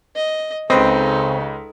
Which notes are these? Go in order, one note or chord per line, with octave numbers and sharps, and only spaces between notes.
D#5
C#2 C#3 C4 D#4 A4 B4 D#5